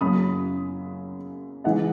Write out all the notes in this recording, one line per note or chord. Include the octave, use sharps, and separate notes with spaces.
F#2 C#3 F#3 A#3 B5 D#6
C#3 E3 G#3 D#5 F#5